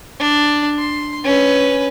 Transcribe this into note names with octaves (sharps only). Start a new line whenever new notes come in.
D4
C6
C#4 B4